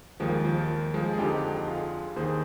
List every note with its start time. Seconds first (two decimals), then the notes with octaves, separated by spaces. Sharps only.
0.20 D#2 D#3 F3 G#3
0.45 F3
0.94 F3 G#3
1.13 G#4
1.18 F2 D3 D#4 G4
1.68 F4 G#4
2.16 D#2 D#3 G#4 C5